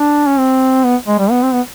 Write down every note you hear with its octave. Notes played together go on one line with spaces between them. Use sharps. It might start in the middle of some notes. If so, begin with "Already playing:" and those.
Already playing: D4
C#4
C4
B3
G#3
G3
B3
C4
B3